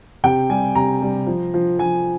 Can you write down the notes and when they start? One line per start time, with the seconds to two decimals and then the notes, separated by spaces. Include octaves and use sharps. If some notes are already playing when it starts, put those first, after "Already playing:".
0.24 C3 G5
0.50 G3 G#5
0.75 C3 A#5
1.02 G3
1.27 F3
1.54 F3
1.79 F3 G#5